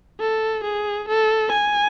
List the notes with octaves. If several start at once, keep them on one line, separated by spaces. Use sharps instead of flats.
A4
G#4
A4
G#5